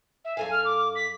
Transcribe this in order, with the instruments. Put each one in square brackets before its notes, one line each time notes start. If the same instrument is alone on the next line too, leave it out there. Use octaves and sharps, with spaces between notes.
[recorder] E5
[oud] F#2 A4 F5 [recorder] G#5
[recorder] F6
D6
B6